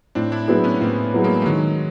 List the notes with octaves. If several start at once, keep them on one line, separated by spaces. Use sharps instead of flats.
A2 C4 D4
D4 E4
F#3 B3 C4 D4 E4 G#4
B3 C#4
A2 A#3 C4
F#3 B3 E4 G#4
G#3 A#3
A3
D#3 F#3 G#3